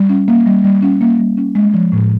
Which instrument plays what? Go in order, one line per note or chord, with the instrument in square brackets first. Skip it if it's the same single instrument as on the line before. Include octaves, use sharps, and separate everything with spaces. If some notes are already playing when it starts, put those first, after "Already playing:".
Already playing: [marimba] G3
C#4
A#3
G3
G3
C#4
A#3
G3
C#4
G#3
F3
A2